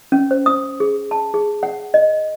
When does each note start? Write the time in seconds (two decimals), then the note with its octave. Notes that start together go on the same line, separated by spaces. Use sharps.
0.12 C#4
0.31 C5
0.46 D#6
0.80 G#4
1.11 A5
1.34 G#4
1.63 F#5
1.94 D#5